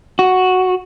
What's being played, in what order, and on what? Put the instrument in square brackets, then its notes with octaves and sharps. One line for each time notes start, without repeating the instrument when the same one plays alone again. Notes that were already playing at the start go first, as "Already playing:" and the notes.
[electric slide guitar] F#4